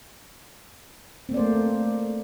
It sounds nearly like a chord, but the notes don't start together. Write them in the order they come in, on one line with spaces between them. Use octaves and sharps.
C4 A#3 D5 C5 A3